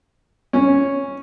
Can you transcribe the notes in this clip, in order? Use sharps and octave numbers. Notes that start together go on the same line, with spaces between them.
C#4